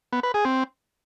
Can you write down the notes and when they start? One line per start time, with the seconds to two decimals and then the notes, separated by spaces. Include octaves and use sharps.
0.13 B3
0.23 B4
0.34 G#4
0.45 C4